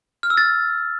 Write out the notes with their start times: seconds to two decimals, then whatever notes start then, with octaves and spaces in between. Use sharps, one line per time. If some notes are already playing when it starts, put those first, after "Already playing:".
0.23 F6
0.30 E6
0.37 A6